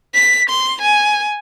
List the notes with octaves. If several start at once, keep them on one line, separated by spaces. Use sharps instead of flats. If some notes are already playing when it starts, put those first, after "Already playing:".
B6
C6
G#5